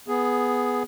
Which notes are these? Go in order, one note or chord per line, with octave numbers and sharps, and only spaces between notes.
B3 G#4